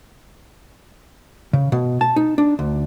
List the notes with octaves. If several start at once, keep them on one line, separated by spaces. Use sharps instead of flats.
C#3
B2
A5
D#4
D4
D2